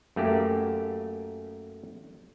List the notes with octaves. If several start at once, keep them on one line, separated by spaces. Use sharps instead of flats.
F#2 A3 A#3 G4